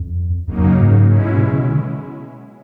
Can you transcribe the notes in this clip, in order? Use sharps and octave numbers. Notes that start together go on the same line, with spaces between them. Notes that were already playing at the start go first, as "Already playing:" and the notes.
Already playing: F2
F2 C#3 F#3 A#3 D#4
F#2
G#2
B2 G#3 C#4 E4
C3
C#3
D3